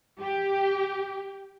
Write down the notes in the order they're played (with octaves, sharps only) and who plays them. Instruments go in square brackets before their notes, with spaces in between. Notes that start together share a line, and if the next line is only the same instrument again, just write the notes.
[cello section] G4